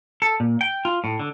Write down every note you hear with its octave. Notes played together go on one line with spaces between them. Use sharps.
A4
A#2
G5
F4
A2
D3